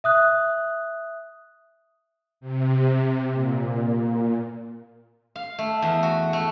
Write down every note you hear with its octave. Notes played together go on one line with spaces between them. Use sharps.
E5 D#6 F#6
C3
A#2
F5
A3
E2
F#4
A3